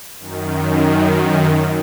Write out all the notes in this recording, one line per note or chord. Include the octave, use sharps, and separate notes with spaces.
F#2 D#3